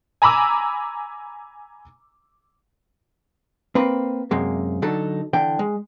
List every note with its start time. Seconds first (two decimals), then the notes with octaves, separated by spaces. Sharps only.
0.22 G#5 A#5 B5 D6 E6
3.75 A#3 C4 B4
4.31 F#2 C3 G#3 A#3
4.82 D3 F#3 D#4 A4
5.33 D3 E3 G5
5.59 G#3